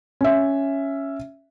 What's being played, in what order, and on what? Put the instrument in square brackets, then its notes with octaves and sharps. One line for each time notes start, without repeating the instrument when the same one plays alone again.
[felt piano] C#4 E5